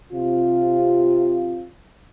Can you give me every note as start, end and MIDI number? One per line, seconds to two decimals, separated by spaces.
0.12 1.64 48
0.12 1.64 65